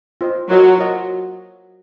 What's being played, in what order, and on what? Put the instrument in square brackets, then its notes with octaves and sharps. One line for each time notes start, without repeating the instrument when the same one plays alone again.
[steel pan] F4 C5 D#5
[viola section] F#3 [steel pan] F4 A#4 D#5 F#5
[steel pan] F4 A#4 D#5 F#5